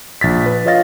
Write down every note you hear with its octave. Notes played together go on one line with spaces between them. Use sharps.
A#1 A6 B6
B4
F4 C#5 D#5 F5 A6 A#6